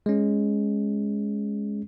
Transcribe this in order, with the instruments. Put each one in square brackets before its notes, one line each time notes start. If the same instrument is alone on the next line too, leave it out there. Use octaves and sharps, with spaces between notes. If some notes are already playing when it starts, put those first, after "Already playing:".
[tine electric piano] G#3 C#4